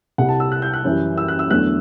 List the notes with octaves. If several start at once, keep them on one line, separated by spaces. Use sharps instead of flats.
C2 C3 G3 F#5
A5
E6
F#6
G6
F#6
F#2 E3 G3
E6
F#6
E6
E2 D3 F#3 A3 F#6